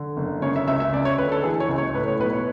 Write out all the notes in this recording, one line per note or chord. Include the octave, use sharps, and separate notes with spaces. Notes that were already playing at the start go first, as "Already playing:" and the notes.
Already playing: D3
F#1
C#3 C#5
E5
C#2 E5
E5
C#3 D5
C#5
D2 B4
A4
E3 G#4
C#5
C#2
C#5
A2 B4
C#5
B1 B4
C#5